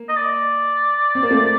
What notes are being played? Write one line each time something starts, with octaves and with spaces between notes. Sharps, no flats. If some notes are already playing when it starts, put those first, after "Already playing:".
Already playing: A#3
D#5
D5
C4
A#3
A3 C4